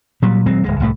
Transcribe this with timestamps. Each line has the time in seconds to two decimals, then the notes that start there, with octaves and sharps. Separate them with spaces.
0.22 A#2 F#3 G3
0.46 D#1 F#3 G#3 C4
0.64 D1 G1 G#3
0.80 C2 A2 A3